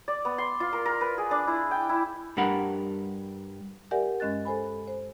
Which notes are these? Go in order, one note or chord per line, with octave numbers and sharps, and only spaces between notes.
D5
B3
C6
F4
A#4
A#4
B4
G#4
D4
E4
G5
E4
G2 G3 D4 A#4 F#5 B5
G4 A#4 D5 E5 F#5 G#5
G2 G#3 C#4 D#5 F#6 A6
A4 C5 G#5 B5
C5